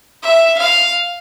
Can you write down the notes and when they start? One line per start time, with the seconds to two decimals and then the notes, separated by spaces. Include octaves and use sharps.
0.23 E5
0.58 F5